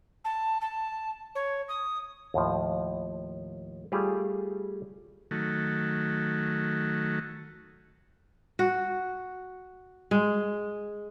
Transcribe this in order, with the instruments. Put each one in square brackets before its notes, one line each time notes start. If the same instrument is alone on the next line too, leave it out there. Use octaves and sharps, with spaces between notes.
[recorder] A5
A5
C#5
D#6
[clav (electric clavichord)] D#2 A2 F3
G3 A3 F4 G4 G#4
[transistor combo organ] D#3 F#3 A3
[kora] F#4
G#3